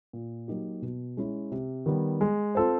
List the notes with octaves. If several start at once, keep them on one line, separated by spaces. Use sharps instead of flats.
A#2
F#3 A#3 D#4 G4
B2
G#3 C#4 E4
C3
D#3 G3 B3
G#3
C4 F4 A4 C5